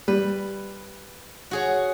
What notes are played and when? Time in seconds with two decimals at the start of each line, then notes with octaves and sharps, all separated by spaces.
0.08 G3 B4
1.51 F#4 G#4 C#5